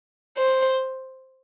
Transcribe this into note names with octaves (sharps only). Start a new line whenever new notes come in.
C5